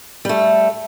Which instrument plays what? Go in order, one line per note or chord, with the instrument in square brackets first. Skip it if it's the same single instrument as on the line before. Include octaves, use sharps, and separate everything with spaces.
[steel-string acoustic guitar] G3 A3